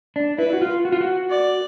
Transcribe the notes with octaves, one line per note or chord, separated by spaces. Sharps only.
D4
E4 B4
F#4
F4
F#4
F4
F#4
D5